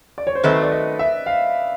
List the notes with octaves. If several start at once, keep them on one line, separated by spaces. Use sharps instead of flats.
D5
C#5
C5
D#3 F#3 A3 C4 B4
D5
D#5
E5
F5